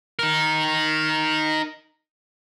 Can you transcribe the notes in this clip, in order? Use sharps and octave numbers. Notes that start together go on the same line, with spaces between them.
D#4 A#4